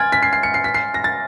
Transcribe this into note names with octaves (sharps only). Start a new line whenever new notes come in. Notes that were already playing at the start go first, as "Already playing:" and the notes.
Already playing: G#5 C6 F6 G#6 A6
B6
C7
C7
C#7
C7
B6
C7
A#6
A6